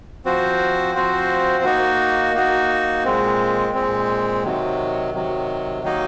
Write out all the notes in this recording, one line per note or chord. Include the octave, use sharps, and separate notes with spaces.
F3 C4 F#4 C5
F3 C4 F#4 C5
A#3 D#4 F#4
A#3 D#4 F#4
A#2 G#3 C4
A#2 G#3 C4
C3 D#3 F#3
C3 D#3 F#3
D#3 F#3 A#3 D#4